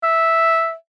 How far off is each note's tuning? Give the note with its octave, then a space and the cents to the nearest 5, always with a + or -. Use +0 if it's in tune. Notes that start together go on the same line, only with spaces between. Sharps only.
E5 -5